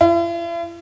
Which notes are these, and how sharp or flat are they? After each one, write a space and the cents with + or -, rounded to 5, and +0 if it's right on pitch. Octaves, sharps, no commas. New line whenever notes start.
E4 +45